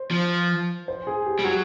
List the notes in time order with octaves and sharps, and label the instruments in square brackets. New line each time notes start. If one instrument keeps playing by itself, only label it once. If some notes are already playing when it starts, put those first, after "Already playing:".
Already playing: [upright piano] C5
[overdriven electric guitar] F3
[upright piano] C5
G#4
G4
[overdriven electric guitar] G3
[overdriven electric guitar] F#3 [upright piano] F#4